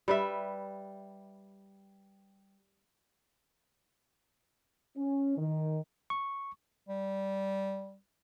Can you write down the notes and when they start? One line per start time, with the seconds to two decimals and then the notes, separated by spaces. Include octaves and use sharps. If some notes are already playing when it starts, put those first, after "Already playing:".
0.08 G3 B4 E5
4.96 C#4
5.37 D#3
6.10 C#6
6.89 G3